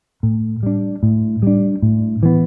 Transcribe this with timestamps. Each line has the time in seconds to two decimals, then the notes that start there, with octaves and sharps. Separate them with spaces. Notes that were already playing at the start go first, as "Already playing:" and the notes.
0.23 A2
0.63 G3 D4
1.03 A2
1.43 G3 D4
1.83 A2
2.23 E3 B3